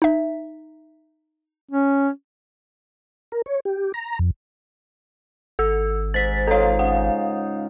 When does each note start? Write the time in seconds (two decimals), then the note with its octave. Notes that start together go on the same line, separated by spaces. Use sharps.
0.02 D#4 E5
1.71 C#4
3.32 A#4
3.46 C#5
3.65 G4
3.94 A#5
4.19 F2
5.59 G#1 A4 E6
6.14 G#2 A6 B6
6.47 D#4 F4 A4 C#5
6.79 C#3 F#5